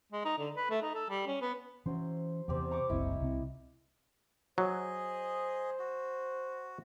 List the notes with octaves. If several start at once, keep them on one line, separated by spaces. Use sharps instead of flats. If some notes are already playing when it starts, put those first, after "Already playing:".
G#3
D#4
D3
B4
A3
D#4
A4
G3
C#4
B3
E3 F#3 C#4 C5
E2 C3 C4 G4 D5
A#5 C#6 D6
F#1 C2 C4 E4 D#5
C2 C3 C4
F#3 G#4 C5 D#5
F#4